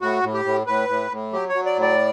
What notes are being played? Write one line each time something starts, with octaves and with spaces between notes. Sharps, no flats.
A2 F#4
A2
G4
A2
A2 B4
A2
A2
F#3 G4
C#5
F#3
D5
A2
D5